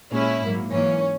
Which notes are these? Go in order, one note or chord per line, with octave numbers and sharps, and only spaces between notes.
A#2 G#3 C#4 E4
G#2 F#3 A#3
G#2 E3 A#3 C#4